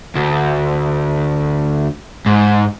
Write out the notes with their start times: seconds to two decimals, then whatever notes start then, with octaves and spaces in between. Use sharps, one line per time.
0.16 D2
2.26 G#2